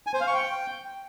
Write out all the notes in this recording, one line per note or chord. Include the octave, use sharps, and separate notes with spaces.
G#5
C5
F5
C#6
G5